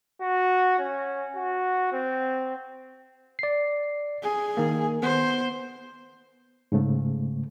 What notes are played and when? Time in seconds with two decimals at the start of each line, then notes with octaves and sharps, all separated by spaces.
0.21 F#4
0.79 C#4
1.36 F#4
1.92 C4
3.39 D5 C7
4.23 G#4
4.57 D#3 A#3
5.03 B3 C5
6.72 G#2 C#3 A3